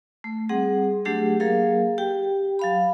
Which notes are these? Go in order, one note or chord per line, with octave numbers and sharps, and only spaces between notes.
A3
G3 C4 G#4 F#5
F#3 A3 D4 G4 G#4 F#5
F#3 A#3 G#4 A#4 F5
G4 G5
F#3 F5 B5